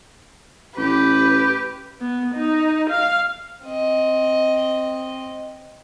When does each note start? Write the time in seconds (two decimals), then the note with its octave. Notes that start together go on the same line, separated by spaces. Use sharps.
0.77 A1 G4 B4
2.00 B3
2.34 D#4
2.90 F5
3.66 C4 D#5